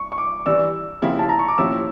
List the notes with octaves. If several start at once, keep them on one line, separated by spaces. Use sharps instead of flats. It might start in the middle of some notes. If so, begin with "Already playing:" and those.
Already playing: C#6
C#6
D6
E3 G3 D4 E6
C#3 F3 A#3 E4 G4
A5
A#5
C#6
D6
A#2 F3 C#4 E4 G4 E6